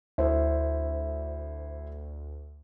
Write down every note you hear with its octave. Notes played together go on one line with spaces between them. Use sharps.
D2 E4 C5